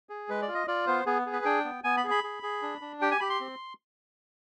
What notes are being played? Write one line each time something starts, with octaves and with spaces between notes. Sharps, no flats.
G#4
G#3 B4
D5
F4
D#5
F4 D5
B3 C5
B3 G#4
G#4
B4
D4 G5
B3
B3 G#5
B5
G#4
B5
G#4
G#4
D4
D4
G4 G5
G#5
G4 B5
C6
C4